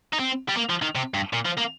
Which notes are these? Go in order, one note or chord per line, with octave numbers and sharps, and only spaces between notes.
D#4
C4
G3
A#3
F3
D#3
C3
G2
A#2
F3
A#3